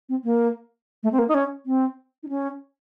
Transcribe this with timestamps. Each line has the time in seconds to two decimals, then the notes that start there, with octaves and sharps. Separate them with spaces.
0.09 C4
0.24 A#3
1.03 A3
1.12 C4
1.19 A#3
1.29 D#4
1.34 C#4
1.66 C4
2.23 D#4
2.29 C#4